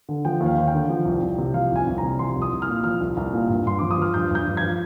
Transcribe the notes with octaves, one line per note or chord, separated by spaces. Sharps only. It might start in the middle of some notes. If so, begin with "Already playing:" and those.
D3
F3 G5
D#2
F5
D#2
G5
D3
F3
C2
C2
C3
F3 F5
C2 G#5
C2
C3 A#5
F3 C6
C2
D#6
C2
F6
A#2
F3 F6
C2
C2
A#2
G2
G2 C6
F3 D6
D#6
F3 F6
G2 G6
G2 G6
F3
G#6
F3